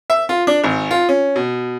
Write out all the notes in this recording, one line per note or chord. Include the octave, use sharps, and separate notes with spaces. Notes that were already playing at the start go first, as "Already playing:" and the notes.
E5
F4
D4
G#1
F4
C#4
B2